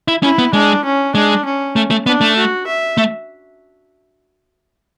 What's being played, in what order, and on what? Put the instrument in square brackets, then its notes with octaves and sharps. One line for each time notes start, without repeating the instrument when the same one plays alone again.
[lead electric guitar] E4
[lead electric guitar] C#4 [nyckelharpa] E4
[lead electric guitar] B3
[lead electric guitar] G#3 [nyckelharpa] D4
[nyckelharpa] C#4
[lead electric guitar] G#3 [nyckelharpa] D4
[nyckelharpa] C#4
[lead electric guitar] A3
A3
[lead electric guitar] B3 [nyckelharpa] D4
[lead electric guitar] A3
[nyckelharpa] F#4
E5
[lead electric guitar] A3